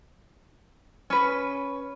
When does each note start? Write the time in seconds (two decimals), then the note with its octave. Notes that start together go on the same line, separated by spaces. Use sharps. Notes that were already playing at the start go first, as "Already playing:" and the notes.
1.10 C#4 B4